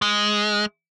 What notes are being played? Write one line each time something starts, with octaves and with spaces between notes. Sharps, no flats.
G#3